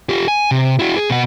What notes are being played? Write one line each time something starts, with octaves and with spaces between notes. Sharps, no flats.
F4 G4
G#5
C3
E4 F#4
G#4
B2 F#5